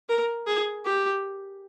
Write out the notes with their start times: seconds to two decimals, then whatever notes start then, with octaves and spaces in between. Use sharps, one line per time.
0.09 A#4
0.47 G#4
0.85 G4